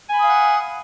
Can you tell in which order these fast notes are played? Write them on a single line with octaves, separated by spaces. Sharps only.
G#5 B5 D#6 F5 F#5